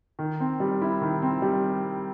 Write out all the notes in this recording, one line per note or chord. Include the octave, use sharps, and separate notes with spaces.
D#3
C4
G3
E4
D#3
C4
G3